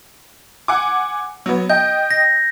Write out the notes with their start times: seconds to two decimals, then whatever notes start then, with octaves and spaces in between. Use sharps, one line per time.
0.68 F#5 G#5 D6
1.46 F#3 B3
1.70 D#5 G5 G6
2.11 A#6